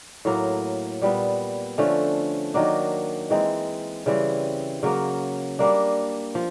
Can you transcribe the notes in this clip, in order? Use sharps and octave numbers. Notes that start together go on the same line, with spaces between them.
A2 F#3 A#3
A#2 G3 B3
D3 F3 A3 C#4
D#3 F#3 A#3 D4
E3 G#3 C4 D#4
C#3 E3 G3 C4
C#3 F#3 A#3
G3 A#3 D4
F3